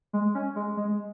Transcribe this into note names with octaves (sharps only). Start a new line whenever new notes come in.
G#3
C#4
G#3
G#3